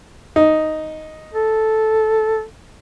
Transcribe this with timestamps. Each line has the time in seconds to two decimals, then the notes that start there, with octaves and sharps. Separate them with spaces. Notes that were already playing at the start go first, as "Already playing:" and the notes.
0.36 D#4
1.33 A4